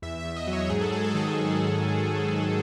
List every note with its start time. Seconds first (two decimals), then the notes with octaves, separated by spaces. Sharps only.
0.02 E2 E5
0.20 E5
0.25 E2
0.36 D#5
0.47 F#3
0.53 C#5
0.69 G#2 G#4
0.81 A4
0.92 F#3 G#4
1.04 A4
1.14 D#3 G#4